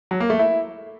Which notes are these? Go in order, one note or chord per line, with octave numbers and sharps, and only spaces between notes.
F#3
A#3
A3
E4